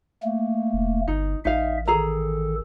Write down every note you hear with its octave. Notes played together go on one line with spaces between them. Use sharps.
A3 A#3
E1
G1 D#4
A1 D#4 E5 F5
D#3 G#4 A4 A#5